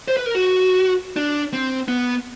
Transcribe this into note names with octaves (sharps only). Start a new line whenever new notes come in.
C5
B4
A#4
F#4
D4
C4
B3